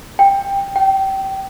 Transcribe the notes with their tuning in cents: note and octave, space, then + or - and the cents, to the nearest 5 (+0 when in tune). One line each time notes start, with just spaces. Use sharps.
G5 +15
G5 -20